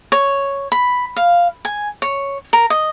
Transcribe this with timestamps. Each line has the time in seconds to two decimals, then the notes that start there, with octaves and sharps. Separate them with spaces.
0.12 C#5
0.72 B5
1.16 F5
1.65 G#5
2.02 C#5
2.53 A#4
2.70 D#5